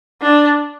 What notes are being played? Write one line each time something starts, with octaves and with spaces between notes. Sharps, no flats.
D4